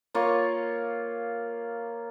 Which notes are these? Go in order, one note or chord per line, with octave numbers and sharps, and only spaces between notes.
A#3 F4 C#5 C#6